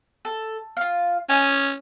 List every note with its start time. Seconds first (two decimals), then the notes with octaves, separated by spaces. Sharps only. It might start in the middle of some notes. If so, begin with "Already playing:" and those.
0.25 A4
0.77 F4 F5
1.29 C#4 D#5 G#5